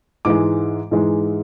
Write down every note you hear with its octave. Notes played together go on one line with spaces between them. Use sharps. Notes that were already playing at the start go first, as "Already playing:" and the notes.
G#2 E3 G#3 D6
G#2 E3 G#3